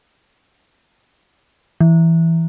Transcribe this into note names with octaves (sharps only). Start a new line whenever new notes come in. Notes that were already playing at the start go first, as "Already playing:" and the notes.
E3